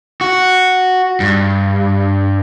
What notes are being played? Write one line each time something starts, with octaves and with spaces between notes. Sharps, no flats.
F#4
G2